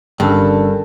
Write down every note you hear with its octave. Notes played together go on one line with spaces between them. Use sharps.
G1 G2 C#4 D4 A4 A#4 A5 E6